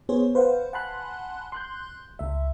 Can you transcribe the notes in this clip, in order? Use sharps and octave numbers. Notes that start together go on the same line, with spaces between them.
B3 G#4 C5 C#5
B4 C5 F5 F#5
F#5 G#5 A5 B5 C6 F#6
C6 F#6 G6
C#2 E5